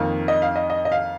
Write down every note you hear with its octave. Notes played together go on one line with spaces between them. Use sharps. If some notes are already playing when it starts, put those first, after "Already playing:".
Already playing: F2 D#3 A#3 F5
D#5
F5
D#5
D#5
D#5
F5